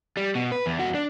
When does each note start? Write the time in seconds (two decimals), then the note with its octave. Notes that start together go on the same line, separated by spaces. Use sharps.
0.17 G3
0.35 B2
0.52 B4
0.66 E2
0.79 E2 F#4
0.95 D4